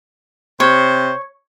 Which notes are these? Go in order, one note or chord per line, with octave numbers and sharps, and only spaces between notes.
C3 C5 C#5